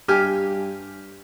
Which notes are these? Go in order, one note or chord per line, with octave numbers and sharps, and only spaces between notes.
G2 G4 G#5 F6